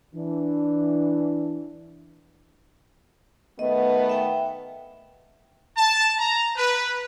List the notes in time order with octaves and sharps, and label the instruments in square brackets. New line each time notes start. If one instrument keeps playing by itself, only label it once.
[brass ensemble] E3 D4
[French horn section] D#3 A3 B3 [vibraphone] D#5
[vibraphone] E5 G5
[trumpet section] A5
A#5
B4